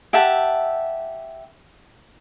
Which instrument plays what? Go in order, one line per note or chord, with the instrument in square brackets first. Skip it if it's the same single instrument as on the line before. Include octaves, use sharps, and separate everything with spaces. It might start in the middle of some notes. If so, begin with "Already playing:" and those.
[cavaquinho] G4 E5 F#5 A5